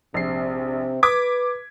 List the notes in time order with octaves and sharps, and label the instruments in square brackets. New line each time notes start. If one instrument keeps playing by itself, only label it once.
[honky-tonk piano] A#1 C7 [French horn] C3
[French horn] B4 [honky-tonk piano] D6 G#6 B6